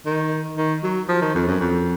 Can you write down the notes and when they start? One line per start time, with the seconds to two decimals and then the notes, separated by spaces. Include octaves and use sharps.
0.06 D#3
0.57 D#3
0.83 F#3
1.09 F3
1.21 D#3
1.35 F2
1.47 F#2
1.60 F2